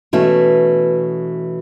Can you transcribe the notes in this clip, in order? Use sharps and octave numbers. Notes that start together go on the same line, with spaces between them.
B2 E3 A3 C#4